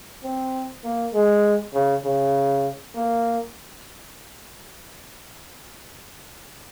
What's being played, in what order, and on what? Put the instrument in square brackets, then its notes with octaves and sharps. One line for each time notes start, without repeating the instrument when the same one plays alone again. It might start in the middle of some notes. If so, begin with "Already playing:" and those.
[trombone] C4
A#3
G#3
C#3
C#3
A#3